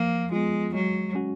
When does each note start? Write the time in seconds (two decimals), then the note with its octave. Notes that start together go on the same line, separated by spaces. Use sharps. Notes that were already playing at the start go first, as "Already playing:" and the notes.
Already playing: F3 A#3
0.32 G#3 B3 F4
0.74 F#3 G#3
1.15 C#4 F#4